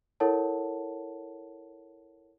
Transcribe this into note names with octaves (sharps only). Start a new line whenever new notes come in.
E4 A4 A#4 C#5 F#5 A5